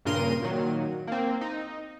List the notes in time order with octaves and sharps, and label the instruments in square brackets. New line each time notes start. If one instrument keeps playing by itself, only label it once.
[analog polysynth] G2 A#2 C#3 A#4 C6 D#7
A#2 D#3 F#3
A#3 C4
D#4